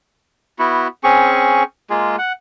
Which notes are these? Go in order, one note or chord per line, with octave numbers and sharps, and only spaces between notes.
B3 E4 F#4
C4 C#4 G#4 C#6
G#3 A#3 F4 G#4
F#5